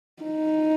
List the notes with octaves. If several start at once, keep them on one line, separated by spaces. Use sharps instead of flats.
D#4